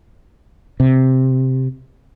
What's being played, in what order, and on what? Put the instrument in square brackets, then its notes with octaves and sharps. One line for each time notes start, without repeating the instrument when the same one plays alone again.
[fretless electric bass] C3